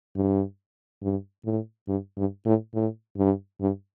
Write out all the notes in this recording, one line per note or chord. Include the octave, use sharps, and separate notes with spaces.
G2
G2
A2
G2
G2
A2
A2
G2
G2